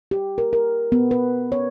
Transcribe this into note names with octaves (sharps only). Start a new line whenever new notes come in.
G4
A#4
A#4
B3
B4
C#5